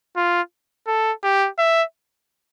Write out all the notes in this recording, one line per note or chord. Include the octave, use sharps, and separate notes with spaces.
F4
A4
G4
E5